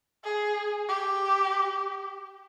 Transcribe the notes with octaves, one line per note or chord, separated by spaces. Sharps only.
G#4
G4